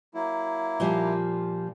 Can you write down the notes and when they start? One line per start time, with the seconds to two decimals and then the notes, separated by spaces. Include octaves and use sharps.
0.14 F#3 A#3 E4
0.80 A#2 F3 G3